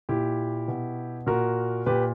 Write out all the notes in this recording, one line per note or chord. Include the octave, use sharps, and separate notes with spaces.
A#2 E4 G4
B2
A#2 F#4 A#4
A#2 G4 B4